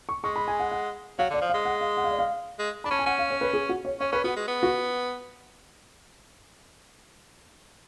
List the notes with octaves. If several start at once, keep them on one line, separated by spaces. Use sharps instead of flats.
C#6
G#3 C#6
B5
G#5
F#5
F#5
F#3 F5
D3
D5
F3
F5
G#3
F#5
F5
F#5
F5
D5
F5
G#3
D4 B5
C#4 A5
G#5
C#4 F#5
F5
C#5
B4
G#4
F#4
C#5
C#4 C#5
C#4 B4
B3 F#4
G#3
B3
F#4